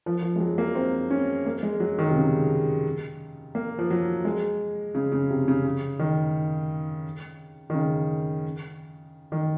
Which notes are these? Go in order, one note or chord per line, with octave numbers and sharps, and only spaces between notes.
F3
F3
G#3
F#3
A#3
C4
C#4
A#3
G#3
F#3
D#3
C3
C#3
A#3
F3
F#3
G#3
C#3
C#3
C3
C#3
C#3
D#3
D#3
C#3
D#3